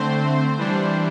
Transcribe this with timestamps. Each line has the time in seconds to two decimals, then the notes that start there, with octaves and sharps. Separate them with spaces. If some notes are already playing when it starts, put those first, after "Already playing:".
Already playing: D3 A3 C4 C5
0.58 E3 G3 D4